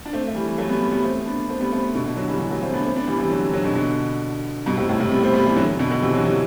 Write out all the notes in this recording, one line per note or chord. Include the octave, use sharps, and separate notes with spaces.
D4
A3 C4
A3
E3 G3
F#3 A3
G3 B3
G3 B3
G3 B3
A3 C4
B3 D4
A3 C4
G3 B3
A3 C4
G3 B3
B2 D3
B2 D3
D3 F#3
E3 G3
E3 G3
F#3 A3
A3 C4
B3 D4
A3 C4
B3 D4
E3 G3
C3 E3
D3 F#3
D3 F#3
B2 D3
B2 D3
G2 B2
A2 C3
A2 C3
A2 C3
G3 B3
A3 C4
G3 B3
E3 G3
D3 F#3
B2 D3
B2 D3
C3 E3
D3 F#3
C3 E3